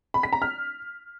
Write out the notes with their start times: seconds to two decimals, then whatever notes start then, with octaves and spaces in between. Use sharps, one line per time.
0.14 B5
0.23 B6
0.33 A#5
0.42 F6